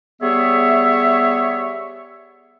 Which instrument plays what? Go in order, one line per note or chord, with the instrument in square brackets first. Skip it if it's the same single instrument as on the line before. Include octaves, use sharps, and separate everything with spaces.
[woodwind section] G3 B3 G#4 C#5 E5